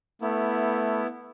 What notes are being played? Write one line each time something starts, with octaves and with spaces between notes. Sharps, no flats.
A3 B3 E4